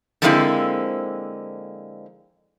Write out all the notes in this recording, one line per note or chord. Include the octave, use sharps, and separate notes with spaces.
D3 F3 G#3 A#3 C4 E4